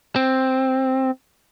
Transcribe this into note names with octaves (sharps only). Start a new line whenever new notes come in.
C4